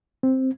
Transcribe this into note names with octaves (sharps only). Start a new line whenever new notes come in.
C4